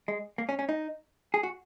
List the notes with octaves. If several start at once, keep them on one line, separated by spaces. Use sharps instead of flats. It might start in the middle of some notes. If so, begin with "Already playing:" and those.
G#3
A#3
C#4
C#4
D#4
G#4
F#4